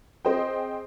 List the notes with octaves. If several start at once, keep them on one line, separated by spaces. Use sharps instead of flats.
C4 G#4 C5 D#5 G5